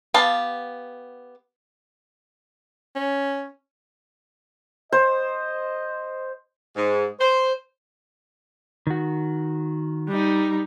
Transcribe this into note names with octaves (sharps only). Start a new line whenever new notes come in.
B3 G4 F5 A5
C#4
C5 D#5
G#2
C5
D#3 F#4
G3 D#4